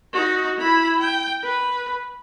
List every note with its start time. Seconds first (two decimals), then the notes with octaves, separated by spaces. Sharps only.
0.13 D#4 F#4
0.58 E4 B5
1.00 G5
1.43 B4